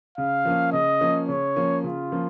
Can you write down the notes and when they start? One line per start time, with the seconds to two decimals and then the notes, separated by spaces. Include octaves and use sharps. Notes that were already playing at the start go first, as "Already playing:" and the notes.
0.18 C#3 F5
0.45 F3 A#3 C#4
0.73 C#3 D#5
1.01 F3 A#3 C#4
1.29 C#3 C#5
1.56 F3 A#3 C#4
1.84 C#3 F4
2.12 F3 A#3 C#4